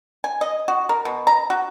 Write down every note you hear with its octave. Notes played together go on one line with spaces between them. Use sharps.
G#5
D#5
F#4
A#4
B2
A#5
F#4